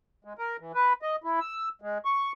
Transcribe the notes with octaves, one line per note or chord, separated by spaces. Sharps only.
G#3
A#4
E3
B4
D#5
E4
E6
G#3
C#6